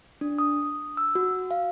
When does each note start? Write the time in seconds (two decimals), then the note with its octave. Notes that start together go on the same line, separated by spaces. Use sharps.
0.21 D4
0.38 D#6
0.97 E6
1.15 F#4
1.51 F5